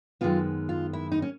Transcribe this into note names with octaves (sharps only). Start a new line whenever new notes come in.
F#2 D#3 G#3 B3 F4
F4
E4
D#4
C#4